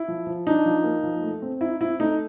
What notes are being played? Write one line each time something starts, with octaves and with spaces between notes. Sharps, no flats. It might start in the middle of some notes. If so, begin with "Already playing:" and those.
Already playing: E4
F3
F3
D4 D#4
F3
A#3
F3
A3
C4
D#4 E4
C4 E4
A3 D#4